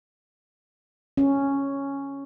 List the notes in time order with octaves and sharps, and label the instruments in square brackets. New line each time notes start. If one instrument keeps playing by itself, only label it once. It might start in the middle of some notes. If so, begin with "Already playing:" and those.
[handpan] C#4